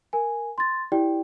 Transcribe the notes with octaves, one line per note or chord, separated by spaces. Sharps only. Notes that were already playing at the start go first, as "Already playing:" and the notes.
A#4 G#5
C6 A6
E4 G4 D5 G5